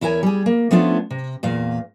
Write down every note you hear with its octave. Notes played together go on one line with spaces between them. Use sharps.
E2 E4 A#4 C#5 G#5
G3 G#4
A#3
F3 A3 B3 C#4 D4 F4
C3
E2 A#2 F5